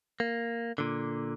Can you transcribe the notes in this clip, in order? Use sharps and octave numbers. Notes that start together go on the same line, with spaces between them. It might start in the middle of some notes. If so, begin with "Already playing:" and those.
A#3
A#2 D3